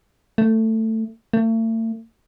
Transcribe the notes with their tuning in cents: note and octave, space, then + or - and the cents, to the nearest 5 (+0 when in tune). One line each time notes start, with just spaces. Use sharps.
A3 +15
A3 +40